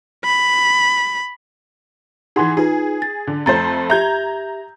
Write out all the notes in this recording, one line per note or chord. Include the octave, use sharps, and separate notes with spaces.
B5
E3 D#4 G#4 F#5 C6
D#4 F4 G#4 B4
A6
D3
F2 A3 C5 A#5 A6
G4 E5 A#5 G6 G#6